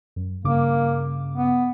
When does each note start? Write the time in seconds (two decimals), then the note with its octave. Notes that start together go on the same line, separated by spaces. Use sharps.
0.16 F#2
0.44 G2 C#3 A#3 D6
1.35 B3